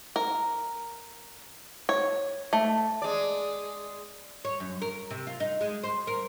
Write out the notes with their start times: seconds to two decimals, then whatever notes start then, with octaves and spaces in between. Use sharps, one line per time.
0.16 A#4
1.89 C#5
2.53 A3
3.02 G#3 D5
4.45 C#5
4.60 F#2
4.82 A#4
5.10 C3
5.27 F4
5.40 D#4
5.61 G#3
5.84 C5
6.07 A#4